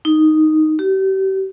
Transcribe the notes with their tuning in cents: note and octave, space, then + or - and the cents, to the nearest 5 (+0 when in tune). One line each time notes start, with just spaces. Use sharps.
D#4 +0
G4 -35